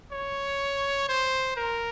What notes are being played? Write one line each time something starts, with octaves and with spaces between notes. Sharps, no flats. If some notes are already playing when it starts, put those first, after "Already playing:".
C#5
C5
A#4